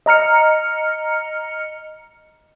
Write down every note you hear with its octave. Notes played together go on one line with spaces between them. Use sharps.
D#5 A#5 F6 C#7